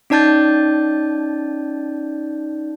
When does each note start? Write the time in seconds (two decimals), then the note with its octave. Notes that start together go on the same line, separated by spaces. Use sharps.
0.10 C#4 D#4 D5 A5 G6 A6